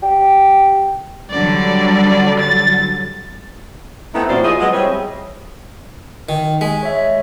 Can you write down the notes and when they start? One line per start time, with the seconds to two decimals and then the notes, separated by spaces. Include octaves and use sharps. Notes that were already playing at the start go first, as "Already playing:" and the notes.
0.03 G4
1.30 D3 F#3 G3 D5
2.39 A6
4.14 A3 B3 C4 D#4 E4
4.28 F#2 A#2 F3 F#3 C5 D5
4.43 E4 F4 G#4 D#5
4.60 F#3 G#3 B3 D#5
4.72 G3 C4 E4 G#4 C5 C#5
6.29 D#3
6.61 G#3 B6
6.83 C#5 E5